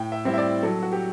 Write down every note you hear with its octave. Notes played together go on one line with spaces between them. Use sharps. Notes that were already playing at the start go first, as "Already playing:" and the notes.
Already playing: A2 G5
E5
G3 C4 E4
E5
D5
F#3 A4
F#4
G4